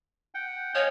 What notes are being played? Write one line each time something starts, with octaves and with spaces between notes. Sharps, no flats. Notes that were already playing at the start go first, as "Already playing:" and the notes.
F#5 G5
C#5 D#5 F5 G#5